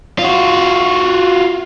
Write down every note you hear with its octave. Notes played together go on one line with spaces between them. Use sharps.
F4 F#4